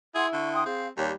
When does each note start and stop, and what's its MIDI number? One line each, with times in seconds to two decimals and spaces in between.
0.15 0.65 64
0.15 0.27 68
0.15 0.26 78
0.15 0.26 84
0.33 0.63 50
0.33 0.49 85
0.53 0.64 79
0.53 0.64 84
0.53 0.64 87
0.66 0.88 60
0.66 0.88 68
0.66 0.88 77
0.97 1.11 39
0.97 1.13 55
0.97 1.13 73